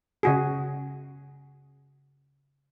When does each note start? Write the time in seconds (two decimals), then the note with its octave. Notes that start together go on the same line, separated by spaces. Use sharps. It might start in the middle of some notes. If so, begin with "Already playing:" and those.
0.23 C#3 F#4 G#4